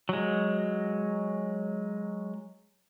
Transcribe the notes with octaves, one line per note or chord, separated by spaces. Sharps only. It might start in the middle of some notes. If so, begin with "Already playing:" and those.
F#3 G#3